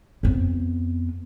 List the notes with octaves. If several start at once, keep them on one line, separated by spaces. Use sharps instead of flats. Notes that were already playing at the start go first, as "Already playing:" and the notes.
F2 B3